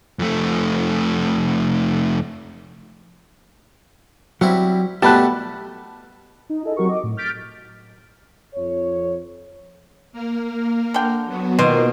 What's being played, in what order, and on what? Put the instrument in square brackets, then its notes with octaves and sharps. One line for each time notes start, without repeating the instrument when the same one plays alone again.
[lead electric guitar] F2 A3
[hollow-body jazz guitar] F#3 [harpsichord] G3 C4 E4
[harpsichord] B2 G3 A3 [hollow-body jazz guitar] G4 [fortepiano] A5 B5 F#6
[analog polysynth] D#4
E4 G#4 A4 D#5
F#3 C4 F#4 G4 A#4 C#6
D#5 D6
A2
F6 G6 A6 B6 D7
[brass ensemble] F2 C#5
[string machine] A#3 A#4
[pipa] D3 G5
[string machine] F#3 B3 F#4
[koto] B2 [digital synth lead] D#3 [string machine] A#3 F4 C5 [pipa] C6